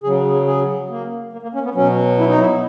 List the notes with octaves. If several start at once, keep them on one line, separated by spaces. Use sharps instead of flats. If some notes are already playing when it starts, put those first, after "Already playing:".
C#3 F#3 G#4
G#4
G#4
A#3
A#3
A#3
C#4
B3
B2 F#3 C#4
E4
D#4
E4